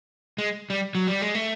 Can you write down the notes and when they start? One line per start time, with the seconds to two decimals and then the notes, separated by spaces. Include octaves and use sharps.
0.38 G#3
0.70 G3
0.95 F#3
1.07 G3
1.22 G#3
1.35 A3